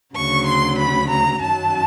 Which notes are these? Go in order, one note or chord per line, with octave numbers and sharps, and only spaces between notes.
D2 C#3 F#3 C#6
C6
B5
A#5
F#2 D#3 F#3 A5